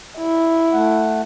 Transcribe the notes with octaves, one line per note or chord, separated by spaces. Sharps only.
E4
A3 F#5